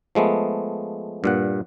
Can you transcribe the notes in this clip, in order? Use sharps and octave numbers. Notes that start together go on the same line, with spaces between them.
F3 G#3 A3 B3
G2 A#2 F#5